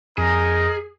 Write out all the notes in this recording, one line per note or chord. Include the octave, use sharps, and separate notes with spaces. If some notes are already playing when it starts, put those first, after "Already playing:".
F2 D#4 G#4 A#4 D#5